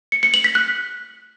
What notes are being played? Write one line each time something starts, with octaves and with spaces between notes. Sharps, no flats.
C#7
C#7
F#7
B6
F#6